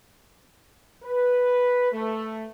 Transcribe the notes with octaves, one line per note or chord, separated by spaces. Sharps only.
B4
A3